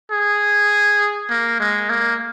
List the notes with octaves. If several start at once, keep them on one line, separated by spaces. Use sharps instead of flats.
G#4
A#3
G#3
A#3